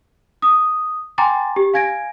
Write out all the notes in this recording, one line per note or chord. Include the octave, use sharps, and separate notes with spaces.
D#6
G5 G#5 A#5 C6 D6 A6
G4
F5 G#5 G#6 A#6 D7